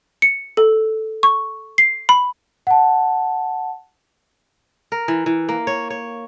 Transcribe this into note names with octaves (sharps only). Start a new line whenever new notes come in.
C#7
A4
C#6
C7
B5
F#5 A5
A#4
E3
E3
A#3
C#5
C#5